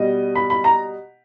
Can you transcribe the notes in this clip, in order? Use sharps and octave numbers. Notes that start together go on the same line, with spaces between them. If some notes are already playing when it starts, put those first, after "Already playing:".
Already playing: B2 G3 D#5
B5
B5
A#5